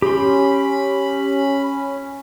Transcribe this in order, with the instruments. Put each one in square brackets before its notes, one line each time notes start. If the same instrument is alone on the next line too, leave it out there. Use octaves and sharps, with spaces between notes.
[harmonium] C#4 [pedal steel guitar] G4 C6 [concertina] B5